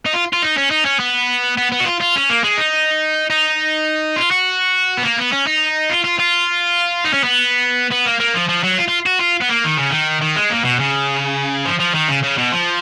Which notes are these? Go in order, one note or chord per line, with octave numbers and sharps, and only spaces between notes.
D#4
F4
F4
D#4
C#4
D#4
C#4
B3
B3
B3
F#4
F4
F4
C#4
A#3
G#3
D#4
D#4
F4
F#4
B3
A#3
B3
C#4
D#4
F4
F4
F4
D#4
C#4
B3
B3
A#3
A#3
F3
F3
F#3
F4
F4
F#4
F4
B3
A#3
D#3
C#3
D#3
D#3
G#3
A#2
B2
C#3
F3
F3
D#3
C#3
C#3
B2
F3